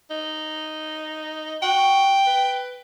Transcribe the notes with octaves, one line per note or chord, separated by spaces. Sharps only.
D#4
F#4 G5
B4